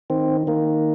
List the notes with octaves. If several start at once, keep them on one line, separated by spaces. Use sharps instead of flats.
D#3 C4
D#3 A#3